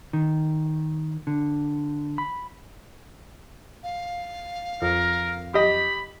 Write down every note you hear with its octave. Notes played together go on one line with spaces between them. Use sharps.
D#3
D3
B5
F5
F2 A#4
G4 D#5 B5